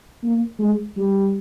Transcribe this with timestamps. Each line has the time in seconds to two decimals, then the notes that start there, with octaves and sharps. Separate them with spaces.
0.23 A#3
0.59 G#3
0.96 G3